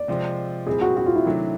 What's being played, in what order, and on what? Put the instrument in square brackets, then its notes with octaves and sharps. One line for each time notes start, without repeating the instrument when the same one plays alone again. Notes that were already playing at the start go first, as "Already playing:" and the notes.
Already playing: [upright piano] D5
[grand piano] C3 F3 G#3 C4
[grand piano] A#2 G3 C4 E4 [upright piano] G#4
[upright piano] F#4
F#4
F4
E4
[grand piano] C3 D#3 F#3 A3 D4